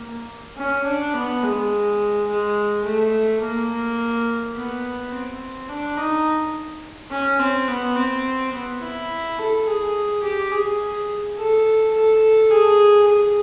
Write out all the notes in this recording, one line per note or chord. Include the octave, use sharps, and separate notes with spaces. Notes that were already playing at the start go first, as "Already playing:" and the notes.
Already playing: A#3
C#4
D4
B3
G#3
G#3
A3
A#3
B3
C4
D4
D#4
C#4
C4
B3
C4
B3
E4
A4
G#4
G4
G#4
A4
A4
G#4
G#4